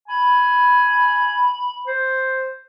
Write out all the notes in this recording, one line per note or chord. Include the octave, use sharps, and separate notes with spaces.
G#5 B5
C5